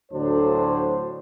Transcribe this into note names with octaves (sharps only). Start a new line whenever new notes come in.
D2 A2 D3 F#3 D4 C5